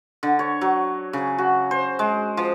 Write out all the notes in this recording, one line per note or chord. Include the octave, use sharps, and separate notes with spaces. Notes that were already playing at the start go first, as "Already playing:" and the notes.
D3
C#5
F#3
C#3
F#4
C5
G#3
F3